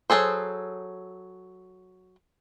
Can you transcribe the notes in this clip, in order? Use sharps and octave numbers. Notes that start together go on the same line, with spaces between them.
F#3 C#4 G#4 A4 C5